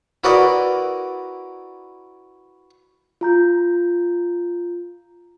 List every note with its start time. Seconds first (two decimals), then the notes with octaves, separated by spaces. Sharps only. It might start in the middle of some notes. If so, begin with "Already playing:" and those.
0.24 E4 F#4 A#4 B4 D5 D#5
3.21 F4 A#5 G6